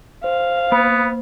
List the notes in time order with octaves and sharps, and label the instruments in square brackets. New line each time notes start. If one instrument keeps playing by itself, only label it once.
[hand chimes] C5 [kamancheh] F5
[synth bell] A#3 [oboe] B3